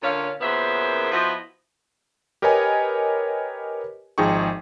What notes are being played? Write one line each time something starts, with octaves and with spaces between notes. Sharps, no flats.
A#2 D3 C#4 C#5 F5
F#2 A#2 C#3 B3 C5 E5
F3 B3 E4 F#4 C5 D#5
G4 A#4 B4 C#5 D#5 G#5
G#1 F3 D#4 G#4 G5 C#6